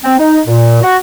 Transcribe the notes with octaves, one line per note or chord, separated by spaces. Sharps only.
C4
D#4
A#2
F#4